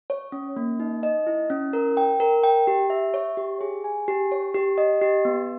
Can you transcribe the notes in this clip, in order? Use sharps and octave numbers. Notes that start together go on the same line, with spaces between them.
C#5
C#4
A#3
D#4
D#5
E4
C#4
A#4
G5
A#4
G5
G4
E5
C#5
G4
G#4
G#5
G4
C#5
G4
D#5
G4
B3